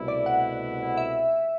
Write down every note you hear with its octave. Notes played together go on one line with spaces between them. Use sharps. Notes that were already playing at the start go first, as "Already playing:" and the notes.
Already playing: C2 B2 A3 E4
D5
F#5
E5